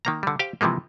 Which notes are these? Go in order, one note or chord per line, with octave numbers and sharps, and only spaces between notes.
D#3 A#3 A#5
D3 G3
G4 C5 F5 G5
C3 E3 F3 G#3 A#3